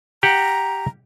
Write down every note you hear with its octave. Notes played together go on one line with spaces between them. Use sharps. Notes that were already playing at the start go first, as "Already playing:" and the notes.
G4 F#5 A#5